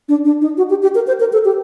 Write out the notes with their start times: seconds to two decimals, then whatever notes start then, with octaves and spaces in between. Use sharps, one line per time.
0.09 D4
0.25 D4
0.41 D#4
0.57 F#4
0.70 G4
0.83 G4
0.95 A#4
1.07 C5
1.20 A#4
1.33 A4
1.45 G4